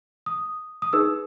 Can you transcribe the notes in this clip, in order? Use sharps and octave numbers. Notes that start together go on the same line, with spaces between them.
D#6
D#6
D#4 G#4 B4 E6